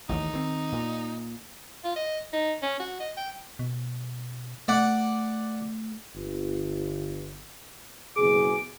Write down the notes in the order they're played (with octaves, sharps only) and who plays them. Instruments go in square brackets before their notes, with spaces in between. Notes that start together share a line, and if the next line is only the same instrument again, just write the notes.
[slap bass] A1 D#2 D#3 [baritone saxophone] D#4
[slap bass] D#3 C4
A#2
[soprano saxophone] F4
D#5
D#4
C#4
F#4
D#5
G5
[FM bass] B2
[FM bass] A3 [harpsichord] D5 F#5 D6
[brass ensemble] G1
[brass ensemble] F#1 B2 G#4 [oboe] D6